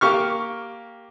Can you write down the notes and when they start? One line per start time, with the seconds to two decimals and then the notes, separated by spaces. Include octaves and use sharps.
0.01 A#3 G4 C#6 F6